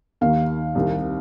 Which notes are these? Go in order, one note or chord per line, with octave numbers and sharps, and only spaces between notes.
D#2 D#3 F5
C2 C3 D#3